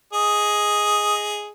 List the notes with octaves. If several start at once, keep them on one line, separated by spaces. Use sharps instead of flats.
G#4 D#5